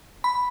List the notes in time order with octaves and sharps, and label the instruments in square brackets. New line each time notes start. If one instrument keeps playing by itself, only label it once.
[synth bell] B5